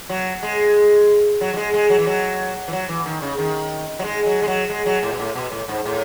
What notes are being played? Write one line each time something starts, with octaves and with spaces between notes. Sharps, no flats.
F#3
G#3
F#3
F#3
G#3
G#3
F#3
E3
F#3
E3
F#3
E3
D#3
C#3
D#3
F#3
G#3
F#3
G#3
F#3
G#3
F#3
A2
B2
A2
B2
A2
G#2
A2